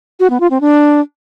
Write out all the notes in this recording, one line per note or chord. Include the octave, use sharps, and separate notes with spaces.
F#4
B3
F4
C4
D4